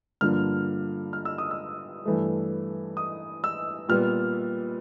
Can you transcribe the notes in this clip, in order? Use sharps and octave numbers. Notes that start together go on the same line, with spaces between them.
G2 D3 F3 A#3 F6
F6
E6
D#6
E6
G2 E3 A3
D#6
E6
A#2 G3 B3 F6